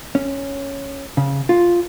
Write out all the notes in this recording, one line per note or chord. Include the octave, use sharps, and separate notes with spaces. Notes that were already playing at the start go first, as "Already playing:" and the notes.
C#4
C#3
F4